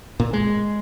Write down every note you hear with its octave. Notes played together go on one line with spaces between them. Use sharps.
A#2
G#3